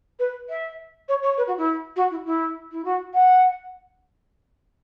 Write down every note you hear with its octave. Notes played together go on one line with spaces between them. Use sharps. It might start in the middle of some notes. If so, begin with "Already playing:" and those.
B4
E5
C#5
C#5
B4
F#4
E4
F#4
E4
E4
E4
F#4
F#5